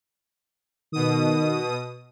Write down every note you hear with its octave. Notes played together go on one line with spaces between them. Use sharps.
B2 D#3 D#6